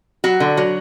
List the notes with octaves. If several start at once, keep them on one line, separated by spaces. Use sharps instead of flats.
F#3 F#4
D3
F#3